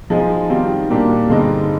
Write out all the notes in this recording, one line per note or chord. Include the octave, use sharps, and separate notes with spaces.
F3 G#3 D#4 G#4
D#3 G3 C4 F4
A#2 G3 A#3 D4 G4
G2 D3 G#3 C4 D#4